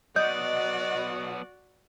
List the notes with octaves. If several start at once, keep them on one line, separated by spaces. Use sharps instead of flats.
F#3 B3 F#4 D5 D#5 G6